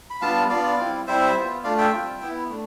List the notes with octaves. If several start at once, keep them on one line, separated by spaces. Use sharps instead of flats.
B5
G3 B3 D4 F4 F5 A5
B3 D4 F4 D5 F5
G3 C4 E4
G3 C4 E4 C5 E5
B3 F4
A3 D4 F4 D5 F5
E5 G5
G3 C4 F4
B3 E4
A3 D4